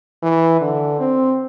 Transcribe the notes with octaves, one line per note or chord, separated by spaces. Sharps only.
E3
D3
C4